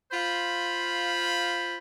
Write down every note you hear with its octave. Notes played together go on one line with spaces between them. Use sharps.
F4 C5 F5 B5